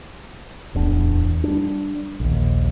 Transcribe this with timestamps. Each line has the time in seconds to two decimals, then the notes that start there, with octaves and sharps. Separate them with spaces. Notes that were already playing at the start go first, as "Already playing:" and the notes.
0.74 D1 E2 D4
1.44 G3 D4
2.20 A#1 D#2